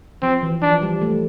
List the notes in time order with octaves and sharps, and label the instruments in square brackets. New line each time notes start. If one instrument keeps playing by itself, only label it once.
[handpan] F3 [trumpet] C4
[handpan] E3
[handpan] F3 [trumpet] D4
[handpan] G3
A3